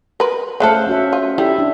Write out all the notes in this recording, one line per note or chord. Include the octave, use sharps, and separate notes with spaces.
A#4 B4
C#3 A3 A4 C5 F5 F#5
C#4 F#4 E5
F4
G3 E4 A4 E5
D4